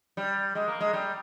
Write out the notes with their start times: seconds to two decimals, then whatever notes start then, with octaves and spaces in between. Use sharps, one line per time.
0.17 G3
0.55 G#3
0.68 A#3
0.81 G#3
0.93 G3